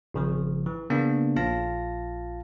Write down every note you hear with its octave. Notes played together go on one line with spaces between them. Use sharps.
G#1 C#3 F3
E3
C#3 A#3 B3 D4
A#1 F4 F5 A5 A#6